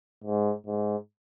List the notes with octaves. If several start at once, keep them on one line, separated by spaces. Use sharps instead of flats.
G#2
G#2